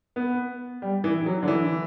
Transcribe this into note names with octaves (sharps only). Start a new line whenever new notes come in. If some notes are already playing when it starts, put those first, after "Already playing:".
B3
G3
E3
F#3
D3
E3